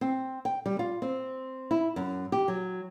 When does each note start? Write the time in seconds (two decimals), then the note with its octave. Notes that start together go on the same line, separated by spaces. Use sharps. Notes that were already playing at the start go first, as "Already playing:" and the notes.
0.01 C4
0.45 G5
0.66 G3
0.79 F4
1.02 C4
1.71 E4
1.96 F#2
2.32 G4
2.48 F#3